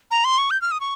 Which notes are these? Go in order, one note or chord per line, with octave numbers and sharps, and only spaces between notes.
A#5
C6
C#6
G6
F6
D#6
C#6